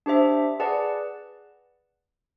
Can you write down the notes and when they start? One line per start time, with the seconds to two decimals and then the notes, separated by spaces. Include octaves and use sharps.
0.06 D4 G4 C5 E5
0.60 G#4 B4 D5 F#5 A5